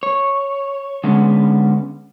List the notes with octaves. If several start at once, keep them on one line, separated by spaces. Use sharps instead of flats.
C#5
D3 G#3 B3 C#4